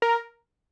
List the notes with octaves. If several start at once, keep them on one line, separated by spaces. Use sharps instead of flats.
A#4